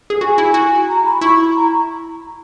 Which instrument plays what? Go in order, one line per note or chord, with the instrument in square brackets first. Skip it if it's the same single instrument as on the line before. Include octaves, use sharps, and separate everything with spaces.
[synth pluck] G#4
[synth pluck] F#4 [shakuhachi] G#5
[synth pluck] E4
F#4
[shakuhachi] A#5
B5
[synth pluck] E4 [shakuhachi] C#6
[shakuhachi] B5
A#5